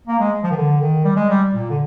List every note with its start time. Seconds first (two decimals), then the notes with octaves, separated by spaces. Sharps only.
0.07 A#3
0.19 G#3
0.44 F3
0.51 D#3
0.56 D3
0.80 D#3
1.05 G3
1.16 G#3
1.29 G3
1.53 A#2
1.70 D3